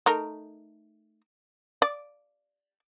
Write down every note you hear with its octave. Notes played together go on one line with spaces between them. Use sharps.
A3 D#4 A#4
D5